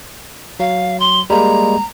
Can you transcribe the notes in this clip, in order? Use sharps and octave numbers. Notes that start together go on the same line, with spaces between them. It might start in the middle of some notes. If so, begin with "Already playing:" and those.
F#3 F5
C6
G3 G#3 A#3 A#5